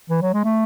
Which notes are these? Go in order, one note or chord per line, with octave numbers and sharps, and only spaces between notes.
E3
F#3
G#3
A3